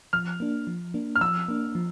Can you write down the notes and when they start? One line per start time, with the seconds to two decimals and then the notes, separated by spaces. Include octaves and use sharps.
0.13 F3 F6
0.40 A#3 D4
0.67 F3
0.94 A#3 D4
1.16 F6
1.21 F3 E6
1.48 A#3 D4
1.75 F3